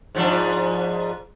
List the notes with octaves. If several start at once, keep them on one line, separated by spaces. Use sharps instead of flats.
G#2 F3 D4